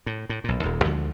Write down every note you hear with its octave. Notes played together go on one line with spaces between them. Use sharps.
A2
A2
B1 A#2
D#1 D#2
D2 D3 F3 G#3